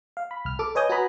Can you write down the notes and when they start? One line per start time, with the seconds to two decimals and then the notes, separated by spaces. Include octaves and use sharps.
0.17 F5
0.31 B5
0.45 C2 F6
0.59 A4 D6
0.75 B4 C#5 D#5 G#5 D#6 G6
0.89 F#4 B4 G#5 A#5 B5 D#6